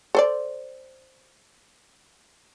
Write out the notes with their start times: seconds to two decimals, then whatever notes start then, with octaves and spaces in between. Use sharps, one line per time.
0.15 A4 C5 D5